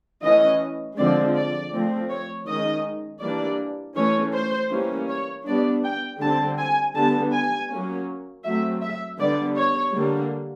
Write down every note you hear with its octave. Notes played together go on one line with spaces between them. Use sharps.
E3 A3 C#4 D#5
D3 F3 G#3 C4 D5
D5
F3 A3 C4
C#5
D#3 G#3 C#4 D#5
E3 G3 A#3 D4 D5
E3 A3 C#4 C#5
C5
E3 G3 A#3 C#4
C#5
G3 B3 D4 D5
G5
D3 G3 C4 A5
G#5
D3 G3 B3 A5
G#5
F#3 A#3 C#4
F#3 A3 C4 E5
E5
D3 G3 B3 D5
C#5
D3 G3 A#3